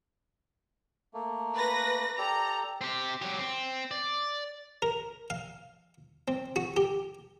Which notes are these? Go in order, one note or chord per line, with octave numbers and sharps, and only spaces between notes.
A3 A#3
B4 A#6
G4 A4 D5 A#5
C4 G4
F#3 G4
C4
D5
A#4
F5
C4
F#4
G4